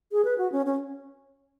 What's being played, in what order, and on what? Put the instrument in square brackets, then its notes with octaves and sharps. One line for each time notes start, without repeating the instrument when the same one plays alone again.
[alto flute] G#4
B4
F#4
C#4
C#4